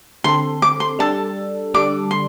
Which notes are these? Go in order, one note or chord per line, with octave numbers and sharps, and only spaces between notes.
D3 C4 A4 C6
D6
C6
G3 D4 A4 A5
D3 G3 D4 A4 D6
C6